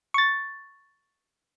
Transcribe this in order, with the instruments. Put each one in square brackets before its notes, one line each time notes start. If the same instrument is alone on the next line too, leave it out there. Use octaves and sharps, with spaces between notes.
[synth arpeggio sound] C#6 A6